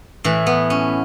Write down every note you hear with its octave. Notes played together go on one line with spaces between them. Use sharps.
A2 E3
B3
C#4